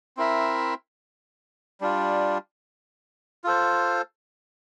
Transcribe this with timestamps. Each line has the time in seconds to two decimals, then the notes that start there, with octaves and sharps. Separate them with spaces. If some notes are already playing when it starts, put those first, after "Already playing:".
0.17 C4 E4 A#4 E5
1.81 G3 D4 F4
3.44 F4 A4 C5